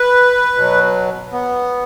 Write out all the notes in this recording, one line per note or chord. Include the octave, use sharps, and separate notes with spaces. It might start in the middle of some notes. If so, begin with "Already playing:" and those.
Already playing: B4
B2 F#3
B3